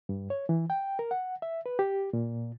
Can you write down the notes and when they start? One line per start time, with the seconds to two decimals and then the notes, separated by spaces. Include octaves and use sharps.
0.09 G2
0.30 C#5
0.49 E3
0.70 G5
0.99 A#4
1.11 F#5
1.42 E5
1.66 B4
1.79 G4
2.13 A#2